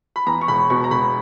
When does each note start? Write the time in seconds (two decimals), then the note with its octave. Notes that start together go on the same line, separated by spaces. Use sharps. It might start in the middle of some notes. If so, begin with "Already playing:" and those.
0.16 B5
0.26 E2 A#5
0.41 C#6
0.48 E1 B5
0.70 B2 C#6
0.84 A#5
0.91 E1 B5